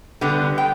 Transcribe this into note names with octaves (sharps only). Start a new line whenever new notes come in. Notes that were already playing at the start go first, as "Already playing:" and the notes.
D3 G3 B3
G5